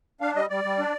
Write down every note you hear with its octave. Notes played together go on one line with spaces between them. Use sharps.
D4 F5
G3 D#5
G3 D5
G3
D4